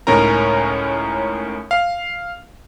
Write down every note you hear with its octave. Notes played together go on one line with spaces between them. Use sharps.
C#2 A2 C#4 D#4 A#4 A#5
F5